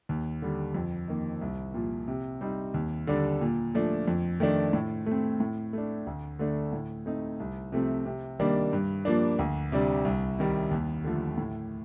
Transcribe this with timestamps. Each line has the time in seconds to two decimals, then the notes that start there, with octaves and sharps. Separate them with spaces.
0.09 D#2
0.42 D3 G3
0.75 F2
1.08 D#3 A#3 D#4
1.41 C2
1.74 A#2 F3
2.08 C3
2.41 G3 C4 D#4
2.74 D#2
3.07 D3 G3 D4
3.41 A#2
3.75 F3 A3 D4
4.08 F2
4.40 D#3 A3 D4
4.73 A2
5.06 A3
5.11 C4
5.40 A2
5.73 A3 D4
6.07 D2
6.39 D3 A3 D4
6.73 A2
7.06 A3 C4 D#4
7.40 C2
7.72 C3 F3 A3 C4
8.06 C3
8.39 D#3 G3 A#3 D4
8.73 G2
9.05 F3 A#3 D4
9.39 D2
9.72 C3 G3 D4
10.05 C2
10.39 C3 D#3 G3
10.71 D#2
11.04 D3 F3 A3
11.38 A2